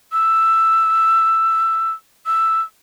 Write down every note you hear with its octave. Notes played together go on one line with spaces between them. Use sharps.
E6
E6